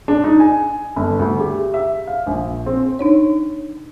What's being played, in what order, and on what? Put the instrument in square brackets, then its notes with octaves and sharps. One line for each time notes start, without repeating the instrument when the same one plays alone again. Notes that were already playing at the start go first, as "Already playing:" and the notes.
[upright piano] D4
D#4
G#5
G1
D2
G4
E5
F5
A#1
C4
[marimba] D4 D#4 C#5